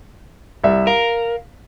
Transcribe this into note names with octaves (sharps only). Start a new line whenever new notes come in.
C2 D5 E5
A#4 F5